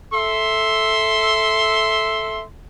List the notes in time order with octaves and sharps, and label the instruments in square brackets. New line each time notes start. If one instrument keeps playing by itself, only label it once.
[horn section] A4 E5 C6